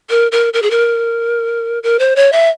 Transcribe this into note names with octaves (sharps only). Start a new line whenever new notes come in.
A#4
A#4
A#4
G#4
A#4
A#4
C5
C#5
E5